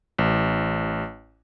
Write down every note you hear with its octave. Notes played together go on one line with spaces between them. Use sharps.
A1